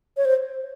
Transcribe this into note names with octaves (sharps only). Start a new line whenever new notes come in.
C#5
C5